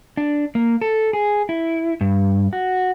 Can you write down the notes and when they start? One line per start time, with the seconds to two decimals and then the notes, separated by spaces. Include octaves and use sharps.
0.17 D4
0.55 A#3
0.81 A4
1.13 G#4
1.49 E4
2.01 G2
2.53 F#4